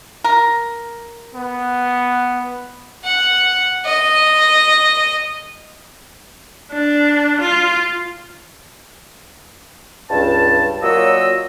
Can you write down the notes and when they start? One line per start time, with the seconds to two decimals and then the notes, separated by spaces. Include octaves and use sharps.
0.24 A#4
1.35 B3
3.04 F#5
3.85 D#5
6.72 D4
7.41 F4
10.10 C#2 G2 A5
10.82 A#2 F#3 A#3 C#5 D#5 E6